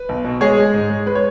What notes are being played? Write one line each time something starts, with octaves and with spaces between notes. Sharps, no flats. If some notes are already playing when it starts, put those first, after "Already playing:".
Already playing: B4
B1
B2
G#3 G#4 C#5
G#3
G#2
G#3
G#3 B4
C#5